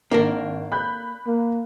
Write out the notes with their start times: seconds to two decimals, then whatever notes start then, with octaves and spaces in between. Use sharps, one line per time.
0.11 G#1 A#3 D4 A#4
0.72 B5 F#6 G6
1.27 A#3